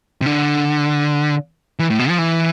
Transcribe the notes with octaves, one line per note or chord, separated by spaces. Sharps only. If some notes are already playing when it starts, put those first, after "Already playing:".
C3
D3
E3
A2
B2
F3
E3